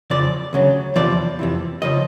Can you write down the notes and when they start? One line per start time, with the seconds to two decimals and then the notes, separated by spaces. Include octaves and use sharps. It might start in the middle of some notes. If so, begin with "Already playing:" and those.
0.10 F2 C#3 F3 D5
0.53 D2 C#3 F#3
0.96 E2 C3 F3 D5
1.39 F2 C3 E3
1.82 C#3 F3 D#5